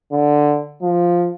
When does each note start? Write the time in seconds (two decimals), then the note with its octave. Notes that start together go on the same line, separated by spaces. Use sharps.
0.13 D3
0.82 F3